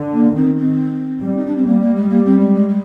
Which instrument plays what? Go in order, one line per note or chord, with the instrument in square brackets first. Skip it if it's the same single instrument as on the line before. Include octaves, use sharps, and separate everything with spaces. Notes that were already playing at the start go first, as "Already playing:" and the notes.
Already playing: [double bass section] D3
[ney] A#3
[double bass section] D#3 [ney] C4
[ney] C4
[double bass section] G3
[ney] D#4
D4
C4
[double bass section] G3 [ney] A#3
[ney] A#3
G#3
A#3
C4
G#3
G#3
G#3